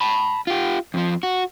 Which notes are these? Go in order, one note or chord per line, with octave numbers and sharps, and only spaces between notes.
A5 B5
F4 G4
F2 F3
F#4